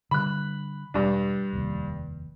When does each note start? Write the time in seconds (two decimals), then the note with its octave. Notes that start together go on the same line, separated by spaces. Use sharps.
0.11 D3 G3 B5 F#6
0.94 E1 G2 D4
1.53 F1 D#2